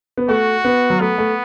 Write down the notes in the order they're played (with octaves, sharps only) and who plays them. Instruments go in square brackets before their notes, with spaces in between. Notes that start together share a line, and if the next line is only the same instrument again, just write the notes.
[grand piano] B3
[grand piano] A3 [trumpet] F#4
[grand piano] B3
F#3
[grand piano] A3 [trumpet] B3
[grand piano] A3